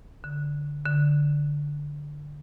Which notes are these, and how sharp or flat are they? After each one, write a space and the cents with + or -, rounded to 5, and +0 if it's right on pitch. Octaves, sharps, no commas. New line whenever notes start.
D3 -10
D3 -5